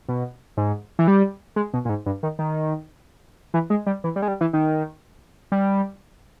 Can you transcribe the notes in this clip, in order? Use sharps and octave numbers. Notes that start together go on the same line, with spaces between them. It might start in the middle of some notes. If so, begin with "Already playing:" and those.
B2
G#2
E3
G3
G#3
B2
A#2
G#2
G2
D#3
D#3
E3
G#3
G3
E3
G3
G#3
G3
E3
D#3
G3